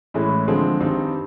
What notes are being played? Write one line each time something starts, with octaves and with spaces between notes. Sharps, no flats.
A2 E3 G#3 C#4 E4
D3 F3 G#3 C4
G2 D#3 G3 C4 D#4